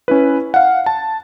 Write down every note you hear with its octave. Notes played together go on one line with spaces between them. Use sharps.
C#4 E4 B4
F5 F#5
A5